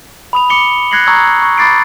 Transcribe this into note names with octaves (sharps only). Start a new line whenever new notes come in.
B5 D#6 F7
D6 C#7 G7
F#6 G#6 A#6 C7 C#7 F#7
A#5 C#6 D#6 E6 G#6
C#6
B5 D6 A6 C7 D7